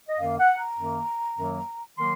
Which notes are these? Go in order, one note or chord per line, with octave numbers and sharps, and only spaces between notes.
D#5
F#2 D#3 A#3 F5
F#5
A#5
F#2 D#3 A#3
F#2 D#3 F#3 A#3
D#3 F#3 A#3 C6